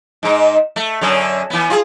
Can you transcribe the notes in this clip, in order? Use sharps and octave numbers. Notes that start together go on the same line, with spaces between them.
G#2 D#4
A3
F#2 D3 C#4
E3 B3
F4 G4 G#4